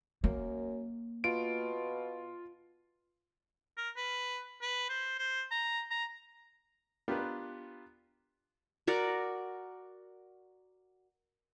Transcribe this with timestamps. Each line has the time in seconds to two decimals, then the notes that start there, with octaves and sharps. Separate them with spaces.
0.24 F#2 A#3
1.24 B2 F4 D7
3.77 A#4
3.97 B4
4.62 B4
4.89 C5
5.19 C5
5.51 A#5
5.91 A#5
7.08 B3 D4 F4 G4 A#4 B4
8.87 F#4 A#4 D5 F#5